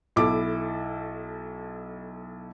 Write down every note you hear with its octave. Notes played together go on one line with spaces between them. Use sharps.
B1 E4 A4 D6